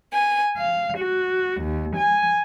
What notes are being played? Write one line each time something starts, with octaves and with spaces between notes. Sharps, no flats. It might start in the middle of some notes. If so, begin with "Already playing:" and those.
G#5
F5
F#4
D#2
G#5